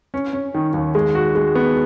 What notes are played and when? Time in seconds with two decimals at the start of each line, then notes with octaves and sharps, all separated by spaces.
0.14 C#4
0.33 C#4
0.54 D#3
0.74 D#2
0.95 G#3
1.15 F#4
1.35 G#3
1.55 B3